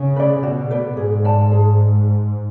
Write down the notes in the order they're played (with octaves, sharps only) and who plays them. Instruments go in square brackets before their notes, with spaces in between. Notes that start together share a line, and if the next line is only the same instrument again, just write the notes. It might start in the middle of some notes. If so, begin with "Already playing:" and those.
Already playing: [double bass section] C#3
[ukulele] B4 D5
[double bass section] B2 [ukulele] F#4
[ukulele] B4 D5
[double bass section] G#2 [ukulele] G#4
[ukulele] D5 A5
G#4